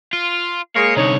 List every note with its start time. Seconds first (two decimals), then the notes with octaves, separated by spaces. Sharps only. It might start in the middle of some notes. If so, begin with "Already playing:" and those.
0.13 F4
0.76 G#3 A#3 G#4 C#5
0.97 C2 D3 D#4 C#5